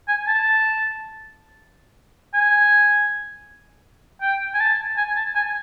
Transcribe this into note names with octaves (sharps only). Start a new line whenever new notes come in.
G#5
A5
G#5
G5
G#5
A5
G#5
A5
G#5